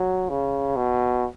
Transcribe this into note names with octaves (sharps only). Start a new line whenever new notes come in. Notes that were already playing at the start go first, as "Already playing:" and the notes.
Already playing: F#3
C#3
B2